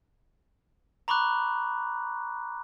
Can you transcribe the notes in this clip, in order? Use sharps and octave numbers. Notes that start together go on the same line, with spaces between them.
A#5 B5 C#6 D6 F#6